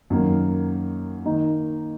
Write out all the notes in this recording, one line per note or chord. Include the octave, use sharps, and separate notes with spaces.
F#2 D#3 A#3
D#3 A#3 D#4